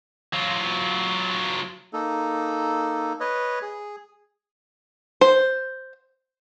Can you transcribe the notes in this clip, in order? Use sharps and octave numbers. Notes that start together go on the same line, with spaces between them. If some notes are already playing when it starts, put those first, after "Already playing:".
F#3 F4
A#3 D#4 A4
B4 C#5 D#5
G#4
C5